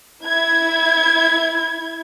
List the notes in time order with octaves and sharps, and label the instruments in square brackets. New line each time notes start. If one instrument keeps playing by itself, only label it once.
[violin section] E4 G#6